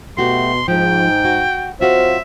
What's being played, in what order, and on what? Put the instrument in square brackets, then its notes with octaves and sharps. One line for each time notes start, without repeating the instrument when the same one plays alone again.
[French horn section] B2 [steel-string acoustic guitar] A3 F#4 G4 [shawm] C6
[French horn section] G#2 [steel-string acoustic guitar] F3 [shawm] G5
[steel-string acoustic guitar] F#4
[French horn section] F#3 C4 C5 [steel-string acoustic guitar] F4 F#4 F5 [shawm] E5